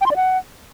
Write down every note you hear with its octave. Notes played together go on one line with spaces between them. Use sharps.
G5
C6
D5
F#5